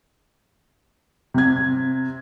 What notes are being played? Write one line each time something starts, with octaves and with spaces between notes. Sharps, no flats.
C3 G#6